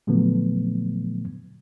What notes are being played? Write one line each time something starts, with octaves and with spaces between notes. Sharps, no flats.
A#2 D3 F3 F#3 A3 B3